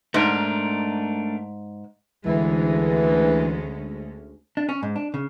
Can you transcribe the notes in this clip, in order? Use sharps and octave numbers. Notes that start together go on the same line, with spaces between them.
G#2 A3 D4 A#4
D2 E3 G#3 C#4
D4
C#4
G#2
D4
C#3